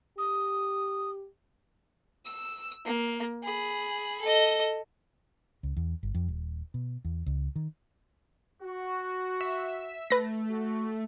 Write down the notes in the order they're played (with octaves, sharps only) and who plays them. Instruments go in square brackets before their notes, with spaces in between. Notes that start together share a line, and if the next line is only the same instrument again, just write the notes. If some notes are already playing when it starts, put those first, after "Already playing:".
[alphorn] G4 [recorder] D#6
[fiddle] E6
A#3
G#4 B5
A4 D#5
[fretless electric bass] C#2
E2
G1
F2
D#1
B2
E2
C#2
D#3
[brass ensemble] F#4
[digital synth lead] E5
[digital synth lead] A3 [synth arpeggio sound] B4 A#6
[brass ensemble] F#4